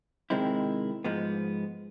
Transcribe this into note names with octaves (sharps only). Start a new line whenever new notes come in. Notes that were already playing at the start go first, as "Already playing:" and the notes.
C3 D#3 G#3 C4 E4
G#2 F3 G#3 B3